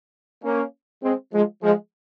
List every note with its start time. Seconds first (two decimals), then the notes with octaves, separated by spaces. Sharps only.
0.43 A#3 C#4
1.03 G#3 C4
1.33 F3 G#3
1.62 F3 G#3